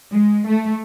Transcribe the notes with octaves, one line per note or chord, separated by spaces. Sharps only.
G#3
A3